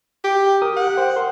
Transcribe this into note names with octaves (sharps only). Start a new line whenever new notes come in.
G4
G4 A#4 D#6
F#5
C5 G5
A#4 C6